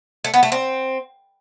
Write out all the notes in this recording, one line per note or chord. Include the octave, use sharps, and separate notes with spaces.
A3
B3
A3
C4